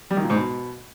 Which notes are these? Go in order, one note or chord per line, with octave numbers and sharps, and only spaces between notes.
G3
D#3
A#2
G#2
B2